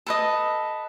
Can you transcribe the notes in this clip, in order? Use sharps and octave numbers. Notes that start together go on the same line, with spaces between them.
A4 B4 D#5